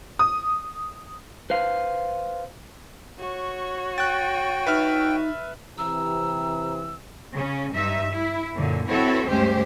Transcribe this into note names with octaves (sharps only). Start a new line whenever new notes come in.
D#6
B4 C5 F5
F#4 C#5
G5 F#6 A6
D#4 B4 E5 F6
C3 E3 A#5 E6
C#3 C#4
G2 D#4 E5
E4
F#2 A#2 D3
C4 E4 F#4 A4 B4 C#5
D2 G2 G#3 C#4 G4 C5